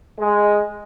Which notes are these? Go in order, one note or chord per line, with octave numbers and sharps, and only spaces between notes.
G#3